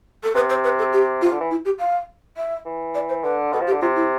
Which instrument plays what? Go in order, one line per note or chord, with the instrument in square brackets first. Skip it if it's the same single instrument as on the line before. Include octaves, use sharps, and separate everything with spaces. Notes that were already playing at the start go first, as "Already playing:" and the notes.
[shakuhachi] A4
[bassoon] C3 [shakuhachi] B4
[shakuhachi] C5
B4
A4
G4
F4
[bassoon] C3
D3
E3
[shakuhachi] E4
G4
F5
E5
[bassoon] E3
[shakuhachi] D5
C5
[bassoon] D3 [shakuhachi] B4
[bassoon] B2 [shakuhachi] A4
[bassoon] F3
[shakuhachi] G4
[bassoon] D3
[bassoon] C3 [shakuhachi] F4
[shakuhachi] E4